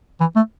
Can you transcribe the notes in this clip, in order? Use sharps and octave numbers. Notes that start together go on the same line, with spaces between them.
E3
A3